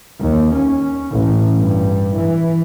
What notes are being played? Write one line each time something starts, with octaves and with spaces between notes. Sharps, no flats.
D#2
C#4
A1
G2
E3